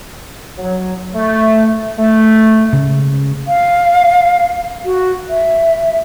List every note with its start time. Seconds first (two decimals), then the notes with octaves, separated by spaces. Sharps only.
0.58 F#3
1.13 A3
1.98 A3
2.73 C#3
3.47 F5
4.85 F#4
5.29 E5